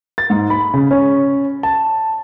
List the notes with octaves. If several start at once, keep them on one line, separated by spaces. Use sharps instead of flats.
A6
G#2
B5
C#3
C#4
A5